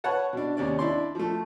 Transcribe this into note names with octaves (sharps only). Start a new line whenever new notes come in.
B4 C#5 F#5 A5
B2 D4
D#2 C3 C#4 D5
D4 E4 D5 C6
F3 A3